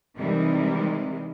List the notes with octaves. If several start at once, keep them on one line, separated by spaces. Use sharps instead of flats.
C3 D#3 E3 G3 G#3